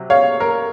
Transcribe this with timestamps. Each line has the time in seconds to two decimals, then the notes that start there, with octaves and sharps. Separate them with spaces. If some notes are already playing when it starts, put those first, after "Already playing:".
Already playing: C3 F#3
0.10 C#5 F5
0.40 A#4